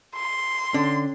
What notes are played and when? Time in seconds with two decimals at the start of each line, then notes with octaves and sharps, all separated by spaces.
0.15 C6
0.74 D3 C#4